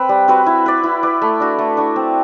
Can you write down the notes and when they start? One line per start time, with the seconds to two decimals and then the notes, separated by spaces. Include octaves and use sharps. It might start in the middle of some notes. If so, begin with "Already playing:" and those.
Already playing: C4 B4
0.09 G3
0.28 C4 F#4 B4
0.46 E4
0.66 B4 D5
0.83 E4
1.03 B4 D5
1.22 A3
1.40 D4 F#4
1.59 A3
1.77 D4 F#4
1.96 C4